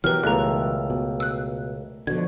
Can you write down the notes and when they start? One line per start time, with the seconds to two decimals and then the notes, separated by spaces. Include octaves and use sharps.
0.04 B2 E3 F#3 G4 A#4 B4 F6
0.23 C#2 A3 B3 A4 A#5 F#6
0.90 B2
1.20 E6 F#6
2.07 B2 D3 F3 F#4 G#6